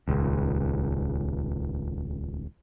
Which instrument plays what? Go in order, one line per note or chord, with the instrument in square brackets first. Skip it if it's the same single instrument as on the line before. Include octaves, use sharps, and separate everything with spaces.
[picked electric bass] D#1 C#2